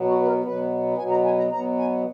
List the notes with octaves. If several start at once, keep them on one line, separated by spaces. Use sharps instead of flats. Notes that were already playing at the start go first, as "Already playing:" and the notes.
Already playing: B2 F#3 B3
F#4
B4
A#4
B2 F#3 B3 B4
B2 F#3 B3 G#5
A#5
G#5
A#5
B2 F#3 B3 A#5
G#5